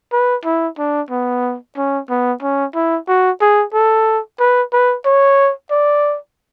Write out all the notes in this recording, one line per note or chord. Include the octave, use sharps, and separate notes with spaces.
B4
E4
D4
B3
C#4
B3
C#4
E4
F#4
G#4
A4
B4
B4
C#5
D5